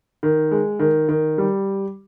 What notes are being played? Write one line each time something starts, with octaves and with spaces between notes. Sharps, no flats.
D#3
G#3
D#3
D#3
G3